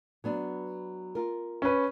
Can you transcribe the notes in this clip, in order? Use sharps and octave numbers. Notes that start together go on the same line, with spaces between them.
F#3 B3 D4
F4 A#4
C#4 B4